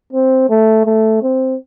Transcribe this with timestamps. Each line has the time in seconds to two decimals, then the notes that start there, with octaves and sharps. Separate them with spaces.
0.13 C4
0.49 A3
0.86 A3
1.23 C4